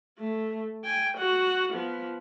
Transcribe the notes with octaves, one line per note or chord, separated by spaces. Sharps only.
A3
G5 G#5
F#4 F#5
F3 B3